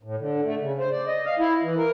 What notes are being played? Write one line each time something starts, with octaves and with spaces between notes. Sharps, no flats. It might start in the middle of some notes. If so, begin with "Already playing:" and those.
A2
D3
A3
C#3
C5
D5
D#5
F5
E4
E3
A#4